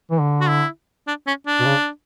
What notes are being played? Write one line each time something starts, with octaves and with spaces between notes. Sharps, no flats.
E3
D3
F#4
E4
D4
C#4
D4
B2
C#3